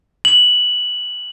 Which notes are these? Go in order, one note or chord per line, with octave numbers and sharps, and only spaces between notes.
F#7